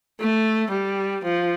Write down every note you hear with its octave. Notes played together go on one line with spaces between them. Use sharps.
A3
G3
F3